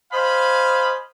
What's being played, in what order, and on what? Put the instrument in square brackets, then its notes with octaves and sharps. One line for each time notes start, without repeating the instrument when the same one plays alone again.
[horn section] C5 D#5 F5 G#5 B5